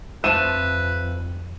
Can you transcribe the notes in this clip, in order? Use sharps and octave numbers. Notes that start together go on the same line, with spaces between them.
F2 F3 A3 B4 D#7 E7